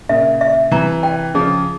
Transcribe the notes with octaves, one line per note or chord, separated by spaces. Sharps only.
A#2 C#3 E5
E5
C3 E3 A#5
G5
C#3 F3 G#4